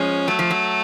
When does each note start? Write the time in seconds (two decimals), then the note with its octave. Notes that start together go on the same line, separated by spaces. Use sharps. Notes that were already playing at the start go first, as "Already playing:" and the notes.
Already playing: F3 G#3 C#4
0.28 F#3 A3
0.39 F3
0.50 F#3